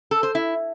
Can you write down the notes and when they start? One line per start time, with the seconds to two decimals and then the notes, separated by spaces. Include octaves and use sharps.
0.11 A4
0.23 C5
0.35 E4